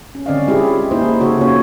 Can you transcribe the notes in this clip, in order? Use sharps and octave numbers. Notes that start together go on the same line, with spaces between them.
C#4
D3 C4 C#4 D5 D#5 F5
G#3 E4 F4 G4 G#4
A#3 D#4 E4 G#4 C5
C#3 F#4 A4 C#5
A#3 C#4 F4 C#5